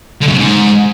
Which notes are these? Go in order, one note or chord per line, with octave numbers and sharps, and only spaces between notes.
D3
F#2
C3
G#2